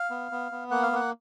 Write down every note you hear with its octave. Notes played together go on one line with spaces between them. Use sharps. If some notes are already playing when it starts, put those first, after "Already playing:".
Already playing: F5
B3
B3
B3
A#3 F#5
F5
A#3 F#5